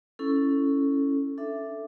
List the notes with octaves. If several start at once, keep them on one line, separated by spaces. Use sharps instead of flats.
C#4 E4 A4
D4 A4 E5